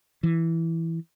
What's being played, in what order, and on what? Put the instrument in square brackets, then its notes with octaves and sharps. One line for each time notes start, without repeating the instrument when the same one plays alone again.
[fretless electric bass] E3